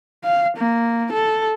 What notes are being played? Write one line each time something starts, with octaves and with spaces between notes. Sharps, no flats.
F5
A#3
A4